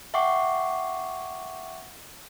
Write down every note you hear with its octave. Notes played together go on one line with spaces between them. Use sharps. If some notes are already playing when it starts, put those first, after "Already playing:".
E5 F#5 G5 C#6 D6 C7